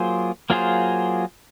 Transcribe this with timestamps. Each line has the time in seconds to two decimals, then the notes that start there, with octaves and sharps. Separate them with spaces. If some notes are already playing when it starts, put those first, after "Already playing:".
Already playing: F#3 A#3 F4 G#4 C5
0.50 F#3 A#3 F4 G#4 C5